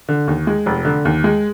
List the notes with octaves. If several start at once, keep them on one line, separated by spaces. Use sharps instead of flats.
D3
D#2
G#3
F1
D3
D#2
G#3